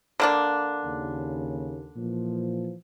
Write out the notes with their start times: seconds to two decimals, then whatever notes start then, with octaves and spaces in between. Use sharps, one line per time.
0.20 D3 A#3 D4
0.85 D#2 C#3
1.96 A#2 E3 F3